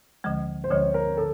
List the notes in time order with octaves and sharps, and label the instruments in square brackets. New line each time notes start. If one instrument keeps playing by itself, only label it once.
[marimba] D2 D3 F3 G#3
[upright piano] C5
[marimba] D2 D3 F3 G#3 [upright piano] C#5
[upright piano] A#4
[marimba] D3 [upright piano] A4